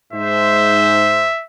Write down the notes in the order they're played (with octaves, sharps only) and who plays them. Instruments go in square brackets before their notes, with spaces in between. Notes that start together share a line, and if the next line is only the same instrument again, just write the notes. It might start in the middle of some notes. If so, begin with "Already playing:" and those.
[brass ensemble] G#2 C5 [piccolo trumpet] E5